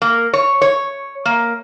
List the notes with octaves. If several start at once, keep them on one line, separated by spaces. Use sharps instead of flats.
A#3
C#5
C#5
A#3